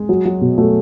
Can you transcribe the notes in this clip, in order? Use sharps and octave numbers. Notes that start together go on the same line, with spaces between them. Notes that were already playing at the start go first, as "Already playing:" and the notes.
Already playing: G#3
F#3
F#3
B2
F#3 A3